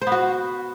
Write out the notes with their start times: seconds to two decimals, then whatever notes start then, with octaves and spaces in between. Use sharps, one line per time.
0.02 C5
0.07 B3
0.12 F#4